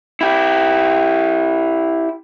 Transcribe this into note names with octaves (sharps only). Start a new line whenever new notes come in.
E4 G4